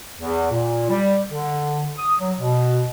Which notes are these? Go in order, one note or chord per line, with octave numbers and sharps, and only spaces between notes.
E2
A#2
G3
D3
D#6
F#3
B2